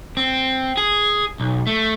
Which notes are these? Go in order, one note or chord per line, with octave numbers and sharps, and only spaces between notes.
C4
G#4
B1
A3